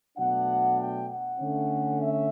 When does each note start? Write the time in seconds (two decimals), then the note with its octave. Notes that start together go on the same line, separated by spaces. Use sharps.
0.17 B2 F#3 A3 D4 F#5
0.79 G5
1.08 F#5
1.40 D3 A3 C#4
2.00 E5